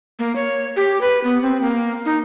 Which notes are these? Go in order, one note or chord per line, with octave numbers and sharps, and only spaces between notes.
A#3
C#5
G4
B4
B3
C4
A#3
D#4